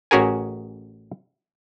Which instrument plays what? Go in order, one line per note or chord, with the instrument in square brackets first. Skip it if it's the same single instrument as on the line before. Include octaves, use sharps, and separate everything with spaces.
[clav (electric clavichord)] A1 C#4 F#4 G#4 A#4 G#5